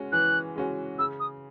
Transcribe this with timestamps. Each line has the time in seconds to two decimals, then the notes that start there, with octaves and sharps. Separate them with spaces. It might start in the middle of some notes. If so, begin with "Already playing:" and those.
Already playing: G#3 C#4 F#4
0.12 E3 F#6
0.55 G#3 C#4 F#4
0.99 C#3 E6
1.20 D#6